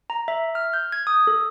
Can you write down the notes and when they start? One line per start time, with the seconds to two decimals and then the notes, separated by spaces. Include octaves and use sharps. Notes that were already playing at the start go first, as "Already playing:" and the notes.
0.10 A#5
0.28 E5
0.55 F6
0.73 G6
0.92 G#6
1.07 D#6
1.27 A4